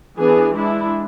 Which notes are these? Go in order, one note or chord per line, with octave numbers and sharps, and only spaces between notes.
E3 B3 D4 G#4
G#3 D4 E4